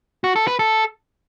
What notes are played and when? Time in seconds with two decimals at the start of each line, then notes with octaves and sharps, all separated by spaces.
0.24 F#4
0.36 A4
0.47 B4
0.59 A4